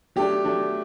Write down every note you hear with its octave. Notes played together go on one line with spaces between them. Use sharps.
F#3 A3 D4 G4
F#3 A3 D4